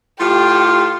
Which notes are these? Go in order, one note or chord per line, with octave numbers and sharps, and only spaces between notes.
A2 F4 G4